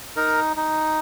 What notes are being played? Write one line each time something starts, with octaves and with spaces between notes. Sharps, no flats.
D#4 A#4
D#4